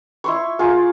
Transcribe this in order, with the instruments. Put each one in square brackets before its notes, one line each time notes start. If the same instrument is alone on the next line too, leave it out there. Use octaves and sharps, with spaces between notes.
[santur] E4 C6 C#6
A#3 F4 G#4